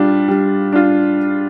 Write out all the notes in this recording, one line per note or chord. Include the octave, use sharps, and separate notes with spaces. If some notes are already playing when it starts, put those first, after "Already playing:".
Already playing: G3 D4 F4
G3
D4 F4